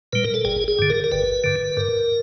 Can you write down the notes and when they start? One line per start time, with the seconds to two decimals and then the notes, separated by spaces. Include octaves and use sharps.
0.13 A#2 G3 B4
0.24 A#4
0.34 A4
0.45 G1 G#4
0.68 G#4
0.79 G2 D3
0.90 A#4
1.04 A#4
1.11 G1 B4
1.44 G2 D3
1.77 G2 A#4